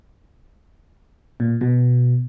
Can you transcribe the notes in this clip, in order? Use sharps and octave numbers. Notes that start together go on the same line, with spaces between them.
A#2
B2